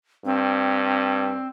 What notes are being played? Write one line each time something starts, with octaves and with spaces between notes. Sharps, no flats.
G2 C4